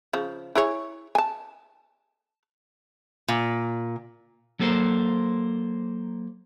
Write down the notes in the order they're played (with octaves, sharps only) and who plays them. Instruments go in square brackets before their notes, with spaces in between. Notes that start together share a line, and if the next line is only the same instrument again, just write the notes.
[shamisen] C#3 F3
E4 G#4 C#5
G#5 A5
[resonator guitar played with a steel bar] A#2
[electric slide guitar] F#3 A#3 A4 A#4 C5